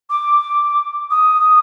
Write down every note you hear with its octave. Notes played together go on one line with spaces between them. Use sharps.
D6
D#6